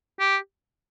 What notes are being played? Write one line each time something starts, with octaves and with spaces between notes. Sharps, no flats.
G4